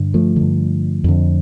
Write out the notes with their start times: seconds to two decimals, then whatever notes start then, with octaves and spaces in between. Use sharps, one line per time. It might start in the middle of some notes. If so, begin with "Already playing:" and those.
Already playing: G2 D3
0.14 F3 A3
0.36 D3
0.41 G2
1.04 F2 D3